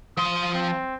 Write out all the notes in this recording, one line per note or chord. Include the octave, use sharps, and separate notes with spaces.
F3 C6 D#6
C4